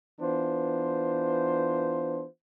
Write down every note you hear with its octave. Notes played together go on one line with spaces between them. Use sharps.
E3 B3 D4 F4 C5